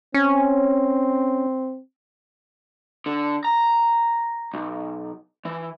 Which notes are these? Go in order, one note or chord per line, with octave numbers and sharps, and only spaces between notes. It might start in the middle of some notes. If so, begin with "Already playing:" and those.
C4 C#4
D3
A#5
B1
E3